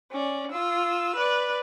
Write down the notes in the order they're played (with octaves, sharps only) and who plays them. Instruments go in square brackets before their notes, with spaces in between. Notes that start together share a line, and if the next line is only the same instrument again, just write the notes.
[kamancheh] C#4 D5
F4 E6
B4 D5